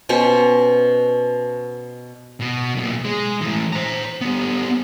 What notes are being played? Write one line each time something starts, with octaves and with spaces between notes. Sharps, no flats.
B2 C#4 C5 C#6
B2
B1 A#2
G#3
E3 A3
C5 A#5
G3 B3